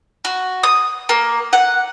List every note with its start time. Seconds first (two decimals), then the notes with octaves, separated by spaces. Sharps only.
0.25 F#4
0.63 D#6
1.09 A#3
1.53 F#5